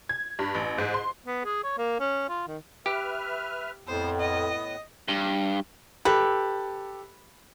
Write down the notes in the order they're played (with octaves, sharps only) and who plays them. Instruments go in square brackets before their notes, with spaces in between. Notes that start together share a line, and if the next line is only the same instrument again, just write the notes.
[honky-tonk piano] G#6
G2
A1
G#2
C6
[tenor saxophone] B3
G#4
C#5
A#3
C#4
F4
D#3
[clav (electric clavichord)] G4 [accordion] B4 E5 F6
[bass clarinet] F2 [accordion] A2 B3 [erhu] C5
[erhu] D#5
[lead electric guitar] G2
[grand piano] G4 A4 [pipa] B4